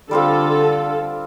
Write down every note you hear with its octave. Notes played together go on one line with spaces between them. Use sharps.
D3 G3 C4 F4 A4